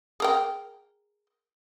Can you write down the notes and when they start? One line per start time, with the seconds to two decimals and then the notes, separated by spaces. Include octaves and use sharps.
0.20 G#4 A#4 G5